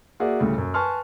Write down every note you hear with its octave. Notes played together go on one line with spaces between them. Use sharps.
A#3 F#4 G#4 D5 E5
D2 A2 C#3 G3
F#2
B4 G#5 A5 C6 C#6 F6